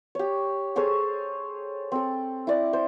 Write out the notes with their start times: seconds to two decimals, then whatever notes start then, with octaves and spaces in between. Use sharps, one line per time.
0.15 G4 C#5
0.76 G#4 A4 C5 C#5
1.92 C4 A4
2.47 E4 D5
2.73 C5